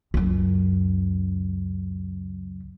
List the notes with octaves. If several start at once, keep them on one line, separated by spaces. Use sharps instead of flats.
C#2 F#2